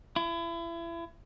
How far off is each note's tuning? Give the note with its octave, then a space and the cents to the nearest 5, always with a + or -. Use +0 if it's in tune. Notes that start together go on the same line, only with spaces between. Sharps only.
E4 +35